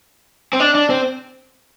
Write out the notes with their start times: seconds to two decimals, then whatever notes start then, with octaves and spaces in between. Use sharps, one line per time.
0.53 C4
0.60 D4
0.75 D4
0.90 C4